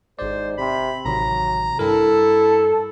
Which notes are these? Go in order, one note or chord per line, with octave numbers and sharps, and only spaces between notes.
G#1 G#2 C5 D5
C3 B5
A1 C3 D#3 F#3 A#5
G2 E4 A4 A#4